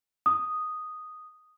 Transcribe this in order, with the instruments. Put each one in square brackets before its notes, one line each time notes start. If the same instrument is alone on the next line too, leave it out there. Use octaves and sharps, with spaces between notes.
[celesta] D#6